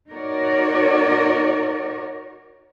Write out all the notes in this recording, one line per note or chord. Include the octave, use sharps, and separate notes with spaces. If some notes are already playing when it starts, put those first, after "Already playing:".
D#4 F#4 A#4 C#5 D5